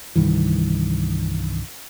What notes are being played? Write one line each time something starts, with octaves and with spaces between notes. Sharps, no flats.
C2 G2 D#3 E3